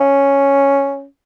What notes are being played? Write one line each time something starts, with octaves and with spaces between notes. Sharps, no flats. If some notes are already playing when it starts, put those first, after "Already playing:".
C#4